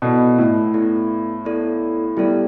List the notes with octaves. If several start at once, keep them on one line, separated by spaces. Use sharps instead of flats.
B2 B3 E4 A4 D5
A2
B3 E4 A4 D5
B3 E4 A4 D5
G3 B3 E4 A4 D5